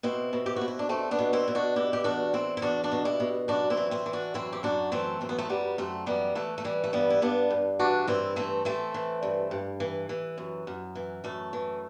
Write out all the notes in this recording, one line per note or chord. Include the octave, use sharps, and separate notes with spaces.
B2 C4 E4
B2
G4
F#4
B2
E4
D4
E2 A3 C4
B3 D4
B2
C4 E4
B2
D4 F#4
B2 E4 G4
G4
E2 D4 F#4
E2 C4 E4
E4
E2 D4 F#4
D4 F#4
B2
E4 G4
B2
F#2 D4 F#4
C4 E4
E3
C4 E4
E3
D4 F#4
F#2 C4 E4
G4
F#2 D4 F#4
E3 A3 C4
F#2 C4
B3
A3 C4
F#2 G3 B3
F#2 A3 C4
E3 G3 B3
E3 A3
A3
E3 G3
A3
G2 G3 B3
E4
G2 B3 D4
G2
E3 D4 F#4
G2 C4 E4
E3 A3 C4
E3 A3 C4
E3
G2
G2
E3
E3
F#2
F#2
E3
F#2 A3
E3